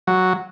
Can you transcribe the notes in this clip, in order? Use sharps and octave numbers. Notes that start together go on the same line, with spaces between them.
F#3